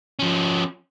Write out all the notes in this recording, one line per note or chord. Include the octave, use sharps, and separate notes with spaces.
F3 C#4